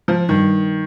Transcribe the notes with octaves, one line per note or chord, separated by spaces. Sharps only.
F3
G2 D#3